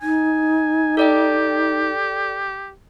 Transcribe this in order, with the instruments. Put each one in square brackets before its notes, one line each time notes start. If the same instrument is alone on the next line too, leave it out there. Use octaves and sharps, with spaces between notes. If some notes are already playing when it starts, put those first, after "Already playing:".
[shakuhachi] D#4 [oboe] G#5
[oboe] G4 [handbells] A4 D5 G5